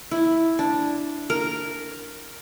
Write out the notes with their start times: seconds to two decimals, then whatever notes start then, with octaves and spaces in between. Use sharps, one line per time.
0.11 E4
0.59 D4
1.30 A#4